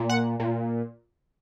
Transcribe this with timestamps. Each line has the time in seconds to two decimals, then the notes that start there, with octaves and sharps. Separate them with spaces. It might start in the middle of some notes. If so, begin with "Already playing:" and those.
Already playing: A#2
0.09 F#5
0.40 A#2